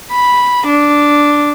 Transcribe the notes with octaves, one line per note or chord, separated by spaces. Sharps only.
B5
D4